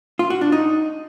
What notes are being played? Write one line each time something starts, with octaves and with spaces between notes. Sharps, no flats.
F4
F#4
D4
D#4